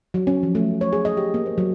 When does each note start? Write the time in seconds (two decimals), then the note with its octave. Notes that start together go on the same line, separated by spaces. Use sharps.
0.14 F#3
0.27 C#4
0.43 F3
0.55 A3
0.81 C#5
0.93 G#4
1.05 D#5
1.17 G4
1.34 A#3
1.46 C5
1.58 F#3